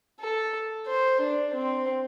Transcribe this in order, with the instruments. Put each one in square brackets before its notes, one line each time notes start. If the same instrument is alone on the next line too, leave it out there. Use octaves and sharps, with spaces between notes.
[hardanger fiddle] A4
C5
D4
C4